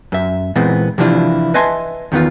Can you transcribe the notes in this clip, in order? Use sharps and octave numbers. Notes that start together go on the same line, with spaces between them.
F#2 E5
A#2 E3 G#3 B3 C4
C3 E3 F3 D4 E4 F4
B4 D#5 E5 G#5 A5 C6
E2 D#3 B3 F4